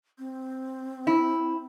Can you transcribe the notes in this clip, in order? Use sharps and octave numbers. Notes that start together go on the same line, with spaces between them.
C4
E4